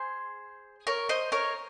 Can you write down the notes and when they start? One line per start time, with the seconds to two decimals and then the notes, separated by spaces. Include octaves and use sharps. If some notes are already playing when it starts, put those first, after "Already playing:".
Already playing: G#4 C5
0.87 A#4 C#5
1.09 C5 D#5
1.32 A#4 C#5